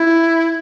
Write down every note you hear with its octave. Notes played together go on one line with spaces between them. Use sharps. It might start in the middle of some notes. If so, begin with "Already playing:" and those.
Already playing: E4